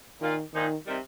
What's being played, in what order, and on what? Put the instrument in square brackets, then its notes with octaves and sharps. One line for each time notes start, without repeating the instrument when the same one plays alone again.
[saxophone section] A#2 A#3 F4 [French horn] D#3
[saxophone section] A#2 F3 D#4 [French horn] D#3
[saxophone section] C3 D#3 G3